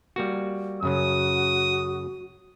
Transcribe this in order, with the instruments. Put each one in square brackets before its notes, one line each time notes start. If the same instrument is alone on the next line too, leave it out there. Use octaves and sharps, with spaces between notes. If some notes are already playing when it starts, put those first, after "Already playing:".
[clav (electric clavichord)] G3 A#3 F#4
[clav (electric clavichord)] F#2 C#3 F#3 [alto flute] F#4 [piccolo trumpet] D#6